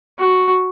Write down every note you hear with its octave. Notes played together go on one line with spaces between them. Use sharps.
F#4